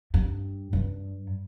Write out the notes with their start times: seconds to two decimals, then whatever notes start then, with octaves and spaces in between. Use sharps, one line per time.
0.14 G2
0.73 G2